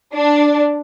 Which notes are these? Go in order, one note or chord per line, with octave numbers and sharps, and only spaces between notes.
D4